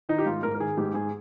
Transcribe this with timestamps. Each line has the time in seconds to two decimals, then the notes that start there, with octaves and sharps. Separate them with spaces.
0.09 D#3 D#4
0.18 G4
0.26 G#2 F4
0.43 G#2 A#4
0.55 A#4
0.60 D#3 G#4
0.77 G#2 G4
0.94 G#2 G#4